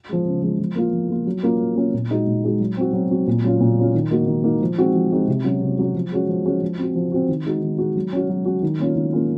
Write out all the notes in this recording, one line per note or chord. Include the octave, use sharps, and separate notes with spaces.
F3 G#3
C#3
F3 G#3
F3
A#3 F4
F3
A#3 F4
F#3
A#3 C#4 F4
F#3
A#3 C#4 F4
A#2
G#3 D#4 F#4
A#2
G#3 D#4 F#4
F#3
C4 F#4
F#3
C4 F#4
A#2
F#3 C#4 F4
A#2
F#3 C#4 F4
D#3
A#3 D#4 F#4
D#3
A#3 D#4 F#4
F3
G#3 C4 D#4 F#4
F3
G#3 C4 D#4 F#4
C3
F#3 C#4 F#4
C3
F#3 C#4 F#4
F3
G#3 C#4 F#4
F3
G#3 C#4 F#4
F3
C4 F#4
F3
C4 F#4
D#3
G#3 D#4 F#4
D#3
G#3 D#4 F#4
F#3
C#4 F#4
F#3
C#4 F#4
D#3
A#3 C#4 F4
D#3
A#3 C#4 F4